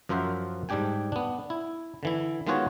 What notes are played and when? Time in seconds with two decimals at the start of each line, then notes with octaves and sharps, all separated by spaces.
0.09 F#2 F3 A#4 C5 E5 F#5
0.69 G#2 G3 D4 G4 G5 G#5
1.12 B3 D4
1.50 E4
2.03 D3 E3 E4
2.47 D#3 G#3 B3 F4 F#4 C#5